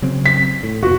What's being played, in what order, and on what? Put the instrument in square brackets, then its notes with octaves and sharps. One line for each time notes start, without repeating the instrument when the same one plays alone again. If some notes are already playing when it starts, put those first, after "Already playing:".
[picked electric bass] C#3 F#3 C4
[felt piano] B6
[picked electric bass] A2
[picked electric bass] F1 B2 [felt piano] F#4